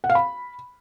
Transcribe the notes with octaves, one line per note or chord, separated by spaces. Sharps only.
F#5
F5
B5